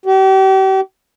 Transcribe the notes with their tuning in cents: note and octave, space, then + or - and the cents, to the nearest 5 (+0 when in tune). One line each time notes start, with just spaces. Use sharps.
G4 -40